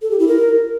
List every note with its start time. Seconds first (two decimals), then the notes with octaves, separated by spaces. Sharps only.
0.02 A4
0.11 G4
0.19 E4
0.28 A#4